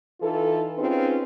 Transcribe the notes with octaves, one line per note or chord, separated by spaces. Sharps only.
E3 D#4 F4 A4
C4 C#4 D#4 F4 G#4 B4